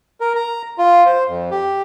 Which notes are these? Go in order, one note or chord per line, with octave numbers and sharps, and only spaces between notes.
A#4
A#5
F4
C5
F2
G4